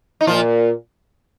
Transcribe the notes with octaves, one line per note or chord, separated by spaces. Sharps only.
D#4
A#2 F3 F4